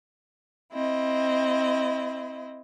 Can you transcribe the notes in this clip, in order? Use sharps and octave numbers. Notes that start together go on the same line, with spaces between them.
C4 E4 D#5